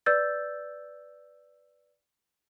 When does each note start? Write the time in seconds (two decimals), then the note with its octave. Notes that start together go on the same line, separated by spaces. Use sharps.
0.06 B4 D5 E6 G6 A6